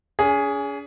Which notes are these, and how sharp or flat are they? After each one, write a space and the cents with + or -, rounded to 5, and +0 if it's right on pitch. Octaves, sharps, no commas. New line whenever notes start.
C#4 +45 G#4 +0